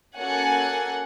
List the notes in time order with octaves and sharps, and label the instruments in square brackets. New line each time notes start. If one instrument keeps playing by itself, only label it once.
[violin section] A#3 C#4 F#4 A4 F#5 G#5